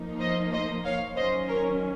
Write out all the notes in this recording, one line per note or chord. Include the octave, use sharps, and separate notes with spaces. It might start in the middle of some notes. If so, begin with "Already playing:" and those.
Already playing: F3 A#3 D#4
C5 D#5
C5 D#5
C#5 F5
D#3 F#3 C#4 C5 D#5
A#4 C#5